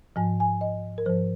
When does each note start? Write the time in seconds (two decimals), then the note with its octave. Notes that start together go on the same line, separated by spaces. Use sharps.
0.16 G#2 F3 G#5
0.40 G#5
0.61 D#5
0.98 A#4
1.06 G#2 F3 C5